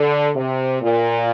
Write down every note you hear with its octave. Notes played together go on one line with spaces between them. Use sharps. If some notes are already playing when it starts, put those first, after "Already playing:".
Already playing: D3
C3
A#2